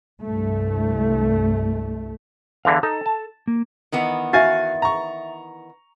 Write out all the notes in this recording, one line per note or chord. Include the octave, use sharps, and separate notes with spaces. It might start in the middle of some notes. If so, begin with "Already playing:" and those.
C2 G2 A3
E2 D3 E3 F5
D#4 A4
A5
A#3
D#3 E3 B3
F#4 E5 F5 G#5 A6
A#5 C#6